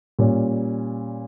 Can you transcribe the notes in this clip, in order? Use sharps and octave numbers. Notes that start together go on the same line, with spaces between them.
A#2 G3 C#4